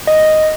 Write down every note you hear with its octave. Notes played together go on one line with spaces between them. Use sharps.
D#5